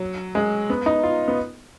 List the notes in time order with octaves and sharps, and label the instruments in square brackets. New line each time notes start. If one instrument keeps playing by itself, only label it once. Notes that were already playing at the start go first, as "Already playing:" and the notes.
Already playing: [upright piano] F#3
G#3
B3
D#4
F4
B3